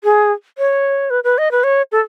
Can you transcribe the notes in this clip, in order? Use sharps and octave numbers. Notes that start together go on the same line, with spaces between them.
G#4
C#5
B4
B4
D#5
B4
C#5
A4